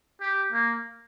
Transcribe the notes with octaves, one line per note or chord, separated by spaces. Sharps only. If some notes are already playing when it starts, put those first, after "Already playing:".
G4
A#3